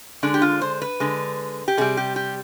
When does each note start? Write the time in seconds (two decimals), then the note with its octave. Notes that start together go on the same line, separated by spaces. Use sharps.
0.23 D3 G#3 D4
0.34 G4
0.42 F4
0.61 C5
0.82 B4
1.00 D3 G#3
1.68 G4
1.77 C3 G3 G#4
1.97 G4
2.16 G4